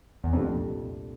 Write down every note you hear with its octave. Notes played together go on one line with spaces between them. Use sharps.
E2
C2 F2 A#2 A3 D4 G4